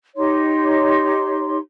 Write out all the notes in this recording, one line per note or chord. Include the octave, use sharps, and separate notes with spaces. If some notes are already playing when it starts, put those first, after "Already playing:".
D#4 G4 C#5 C6